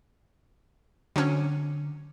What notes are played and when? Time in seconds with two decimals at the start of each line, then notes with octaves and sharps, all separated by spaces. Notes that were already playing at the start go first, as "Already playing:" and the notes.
1.16 D3 F#3 C4 C#4